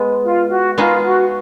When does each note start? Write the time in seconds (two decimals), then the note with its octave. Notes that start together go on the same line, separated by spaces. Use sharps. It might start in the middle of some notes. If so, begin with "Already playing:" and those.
Already playing: G#3 B3
0.24 F4
0.51 F#4
0.78 G#3 B3 D#4 F4 G#4
1.05 F#4